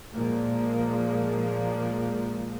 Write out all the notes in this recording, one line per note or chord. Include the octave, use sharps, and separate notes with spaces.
A#2 F3 G#3 A#3